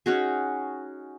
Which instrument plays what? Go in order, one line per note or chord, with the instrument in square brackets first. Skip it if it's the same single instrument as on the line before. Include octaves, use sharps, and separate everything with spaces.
[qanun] C#4 D#4 F#4 G#4